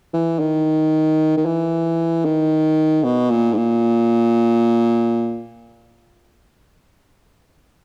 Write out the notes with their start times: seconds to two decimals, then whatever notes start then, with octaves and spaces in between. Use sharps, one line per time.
0.13 E3
0.39 D#3
1.37 D#3
1.45 E3
2.25 D#3
3.04 B2
3.30 A#2
3.53 G#2
3.57 A#2